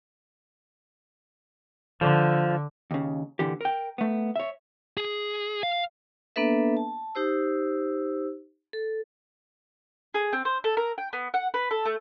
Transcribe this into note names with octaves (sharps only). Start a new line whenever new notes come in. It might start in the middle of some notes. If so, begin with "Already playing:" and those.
D3 F3
D#2 C#3
A#2 D3 E3 G4
A#4 G5
A3 B3
C#5 E5
G#4
F5
A#3 B3 D4 A4 B4 E5
A5
D#4 G4 C5 E6
A4
G#4
C4
C5
A4
A#4
G5
B3
F#5
B4
A4
A3